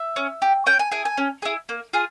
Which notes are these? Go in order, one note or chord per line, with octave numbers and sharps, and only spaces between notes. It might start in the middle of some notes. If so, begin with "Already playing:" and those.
Already playing: E5
C#4
G4
C#4 G5
G#5
E4 G#4 G#5
G#5
C#4
E4 G#4
A#3
F4 G#4